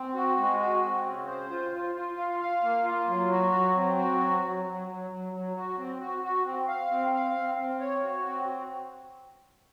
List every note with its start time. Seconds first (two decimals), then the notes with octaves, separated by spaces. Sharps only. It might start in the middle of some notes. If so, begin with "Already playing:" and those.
Already playing: C4
0.14 F#4
0.37 G#3
0.59 F#4
0.82 C4
1.05 C#3
1.27 C5
1.50 F4
1.72 F4
1.95 F4
2.17 F5
2.40 F5
2.63 A#3
2.84 F4
3.07 F#3
3.30 F#4
3.52 F#3
3.75 C4
3.97 F#4
4.20 F#3
4.42 F#3
4.65 F#3
4.88 F#3
5.11 F#3
5.32 F#3
5.55 F#4
5.78 C4
6.00 F#4
6.23 F#4
6.45 C4
6.68 F5
6.90 C4
7.13 F5
7.35 C4
7.58 C4
7.80 C#5
8.03 F#4
8.25 C4